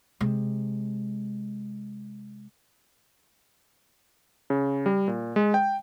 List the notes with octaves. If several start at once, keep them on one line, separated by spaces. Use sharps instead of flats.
C3 G#3
C#3
G3
A#2
G#3
G5